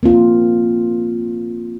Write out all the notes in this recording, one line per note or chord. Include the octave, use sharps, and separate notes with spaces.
A#3 C4 F4